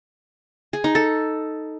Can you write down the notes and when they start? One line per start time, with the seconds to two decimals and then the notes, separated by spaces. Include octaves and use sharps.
0.73 G#4
0.84 D#4
0.95 A4